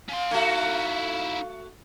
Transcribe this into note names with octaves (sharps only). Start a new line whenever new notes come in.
C#4 F5 C6
A3 D#4 E4 F#4